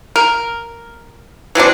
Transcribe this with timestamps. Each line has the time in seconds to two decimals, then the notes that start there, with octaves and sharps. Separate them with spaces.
0.16 A#4
1.55 E3 F#3 C4 D4